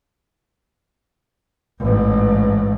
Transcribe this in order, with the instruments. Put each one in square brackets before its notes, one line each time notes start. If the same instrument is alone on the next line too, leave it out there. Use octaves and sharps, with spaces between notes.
[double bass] A1 G#2